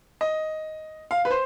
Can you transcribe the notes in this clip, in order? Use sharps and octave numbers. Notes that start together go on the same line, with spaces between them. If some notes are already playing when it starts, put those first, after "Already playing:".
D#5
F5
B4
C5